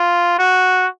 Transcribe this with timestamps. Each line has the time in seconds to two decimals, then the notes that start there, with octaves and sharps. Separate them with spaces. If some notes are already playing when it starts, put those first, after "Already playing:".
Already playing: F4
0.39 F#4